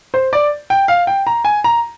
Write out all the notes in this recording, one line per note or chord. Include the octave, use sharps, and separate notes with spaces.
C5
D5
G5
F5
G5
A#5
G#5
A#5